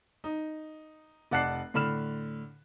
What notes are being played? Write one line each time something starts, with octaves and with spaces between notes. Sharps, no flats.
D#4
F1 D5 F#5 A5 F#6 C7
A2 D3 B5 F6 E7